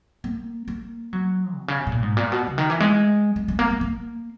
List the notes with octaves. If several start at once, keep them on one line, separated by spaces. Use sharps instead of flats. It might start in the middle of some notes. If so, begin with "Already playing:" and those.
A#3
A#3
F#3
B2
C#3
B2
A#2
G#2
A#2
B2
C#3
D#3
E3
G#3
G#3
G#3
A#3
A#3
A#3